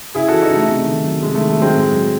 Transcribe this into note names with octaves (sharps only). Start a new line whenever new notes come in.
C#3 E4 G#4
E3 F#4 A4
D#4 F#4
C#3
A3
C3
D#3
F#3
C3 G#3
D#3 A3
A3
F#3 G#3 C4
A2
F#3